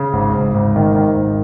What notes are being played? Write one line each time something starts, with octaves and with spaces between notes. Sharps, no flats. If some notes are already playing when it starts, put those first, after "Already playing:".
Already playing: C#3
G#1
G#1
G#1
D#3
D#3
G#1